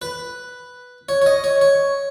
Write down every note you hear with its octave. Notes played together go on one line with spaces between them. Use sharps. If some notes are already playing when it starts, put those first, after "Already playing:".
B4
C#5
C#5
D#5
C#5
C#5